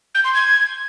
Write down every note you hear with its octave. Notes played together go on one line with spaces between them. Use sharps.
G6
C6
G#6